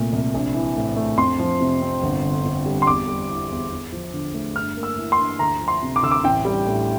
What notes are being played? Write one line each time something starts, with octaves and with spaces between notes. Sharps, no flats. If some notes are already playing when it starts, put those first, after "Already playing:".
Already playing: C2 A#2 A3
C2
A#1
E3
A2
A3
F2 C6
F3
C3
C4
G1
D3
F2
G3
C6
E2 D6
G3
E3
E2
E2
F3
D3
A3
G2 F6
A#3
E6
E3
C6
G2
D2 A#5
F3
C6
C3
D6
D2 E6
D6
A1 G5
G3
A2